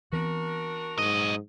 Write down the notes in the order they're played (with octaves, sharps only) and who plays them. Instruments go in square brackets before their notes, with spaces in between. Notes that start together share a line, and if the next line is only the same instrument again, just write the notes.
[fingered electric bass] E3 B3 C4 [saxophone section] D4 F#4 A#4
[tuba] G#2 [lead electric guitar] F#3 D#5